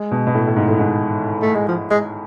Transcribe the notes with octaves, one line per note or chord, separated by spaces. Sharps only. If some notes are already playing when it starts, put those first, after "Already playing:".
Already playing: G#3
B2
B2
A2
A2
G#2
A2
G#2
A3
G#3
F3
G#3